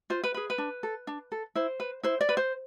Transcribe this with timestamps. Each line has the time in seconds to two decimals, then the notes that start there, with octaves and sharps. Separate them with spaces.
0.10 F4 C5
0.24 B4
0.34 G#4 B4
0.50 B4
0.58 D4
0.83 A4
1.07 D4
1.32 A4
1.55 E4 C5
1.80 B4
2.03 E4 C5
2.21 D5
2.29 B4
2.37 C5